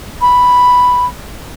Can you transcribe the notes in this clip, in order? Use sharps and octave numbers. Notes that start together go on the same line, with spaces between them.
B5